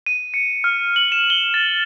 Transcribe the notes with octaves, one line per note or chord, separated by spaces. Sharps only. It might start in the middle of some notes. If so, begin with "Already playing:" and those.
D#7
C#7
F6
F#7
E7
G7
A6